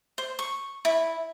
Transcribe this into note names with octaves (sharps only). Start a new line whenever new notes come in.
C5
C#6
E4